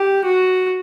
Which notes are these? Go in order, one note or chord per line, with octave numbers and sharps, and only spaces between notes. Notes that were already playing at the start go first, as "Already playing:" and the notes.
Already playing: G4
F#4